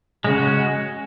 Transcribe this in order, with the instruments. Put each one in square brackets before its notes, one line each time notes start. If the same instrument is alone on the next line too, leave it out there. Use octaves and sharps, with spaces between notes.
[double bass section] C#3 [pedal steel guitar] G#3 C#4 F#4